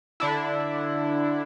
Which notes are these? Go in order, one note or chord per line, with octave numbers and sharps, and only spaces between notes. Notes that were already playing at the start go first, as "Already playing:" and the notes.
D3 D4 E4